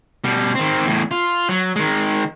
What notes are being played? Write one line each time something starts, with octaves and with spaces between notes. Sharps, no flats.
B2 G3
D#3 C4
E2 A2
F4
F#3
D#3 G#3